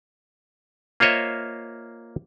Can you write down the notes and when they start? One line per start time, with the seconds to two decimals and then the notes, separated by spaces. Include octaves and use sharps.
1.00 A#3 F4 C5 C#5 D#5 E5